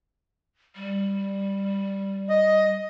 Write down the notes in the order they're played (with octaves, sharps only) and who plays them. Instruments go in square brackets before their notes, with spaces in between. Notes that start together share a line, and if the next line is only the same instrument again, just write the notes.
[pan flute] G3
[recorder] D#5